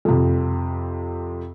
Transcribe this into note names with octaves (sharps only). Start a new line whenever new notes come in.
F2 C3